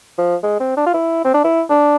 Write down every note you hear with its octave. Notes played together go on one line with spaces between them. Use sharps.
F3
G#3
C4
D4
F4
E4
C4
D4
E4
D4